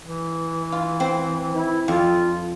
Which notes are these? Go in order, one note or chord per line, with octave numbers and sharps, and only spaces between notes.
E3
F4
C4
E4
F2 F4